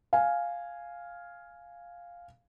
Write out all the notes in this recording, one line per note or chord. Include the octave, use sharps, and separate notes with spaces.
F5 G#5